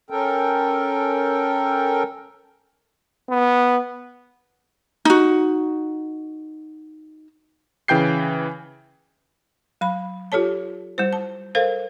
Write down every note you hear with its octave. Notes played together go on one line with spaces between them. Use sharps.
C#4 A4 A#4 G5
B3
D#4 F#4
C#3 E3 G5 G6 C7
F#3 B5
F4 G4 A4 C#5 A5
G3 E4 C5
A5
A4 A#4 C5 F5